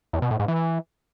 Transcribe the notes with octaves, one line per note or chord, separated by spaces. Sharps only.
E2
B2
A2
G#2
E3